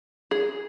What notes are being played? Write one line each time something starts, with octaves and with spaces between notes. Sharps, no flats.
G#4